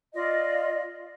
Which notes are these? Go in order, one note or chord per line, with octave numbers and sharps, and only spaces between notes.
F4 D5 D#5